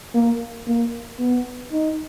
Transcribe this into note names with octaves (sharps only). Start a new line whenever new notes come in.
A#3
A#3
B3
D#4